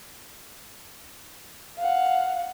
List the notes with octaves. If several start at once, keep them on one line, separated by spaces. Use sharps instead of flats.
F5 F#5